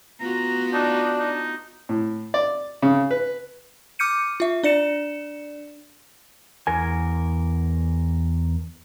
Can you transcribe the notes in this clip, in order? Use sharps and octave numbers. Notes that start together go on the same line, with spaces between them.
B3 F4 F#4 A#5
D4 D#4
D#4
A2
D5
C#3
B4
D6 F6 G6 C#7 D#7
F4 E5
D4 D5 C#7 E7
E2 A#4 G#5